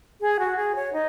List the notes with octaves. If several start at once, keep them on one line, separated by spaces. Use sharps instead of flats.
G#4
F#4
G#4
C#5
D#4